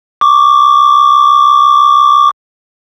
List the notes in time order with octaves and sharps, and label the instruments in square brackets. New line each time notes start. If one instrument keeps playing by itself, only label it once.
[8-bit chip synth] C#6 D6